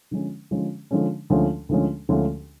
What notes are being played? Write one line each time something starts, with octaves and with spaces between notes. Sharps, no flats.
D3 F3 G#3 C#4
D3 F3 G#3 C#4
D3 F3 G#3 C#4
D2 D3 F3 G#3 C#4
D2 D3 F3 G#3 C#4
D2 D3 F3 G#3 C#4